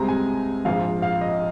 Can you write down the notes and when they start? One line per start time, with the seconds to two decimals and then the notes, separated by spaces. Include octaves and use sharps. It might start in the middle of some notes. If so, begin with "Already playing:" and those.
Already playing: C2 C3 G#3 C4 A#5
0.08 G#5
0.65 A#1 G#2 F3 F5
1.02 F5
1.21 D#5